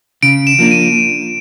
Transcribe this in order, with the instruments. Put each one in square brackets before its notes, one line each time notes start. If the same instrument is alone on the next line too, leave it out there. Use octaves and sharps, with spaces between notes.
[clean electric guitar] C#3 [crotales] D7
[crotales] E7
[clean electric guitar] F3 A#3 D4
[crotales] D#7